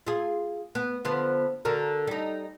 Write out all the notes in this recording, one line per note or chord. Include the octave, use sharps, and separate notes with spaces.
F4 G#4
B3
D3 F3 B3
D3 F#4 A#4
G3 D#4